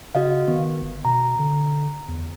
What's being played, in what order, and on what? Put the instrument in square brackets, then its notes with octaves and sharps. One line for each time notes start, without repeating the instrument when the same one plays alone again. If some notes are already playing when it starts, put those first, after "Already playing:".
[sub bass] C#3 [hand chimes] F#4 D#5 F5
[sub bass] D#3 [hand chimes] B3
[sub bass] G1
[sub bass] B2 [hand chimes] A#5
[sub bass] D3
E2